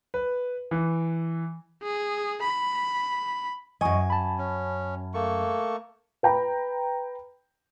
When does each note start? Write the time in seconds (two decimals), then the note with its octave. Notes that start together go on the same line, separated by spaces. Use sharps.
0.14 B4
0.71 E3
1.83 G#4
2.42 B5
3.81 F#2 D#5 G#5 C#6 D#6
4.10 A5 B5
4.38 C#4
5.14 A3 A#3 C#6
6.23 B4 G5 A#5 B5